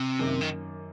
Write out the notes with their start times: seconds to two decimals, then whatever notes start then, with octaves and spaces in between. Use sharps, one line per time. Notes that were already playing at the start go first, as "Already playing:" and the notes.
Already playing: C3
0.19 F#2 D#3 A#3
0.41 D#3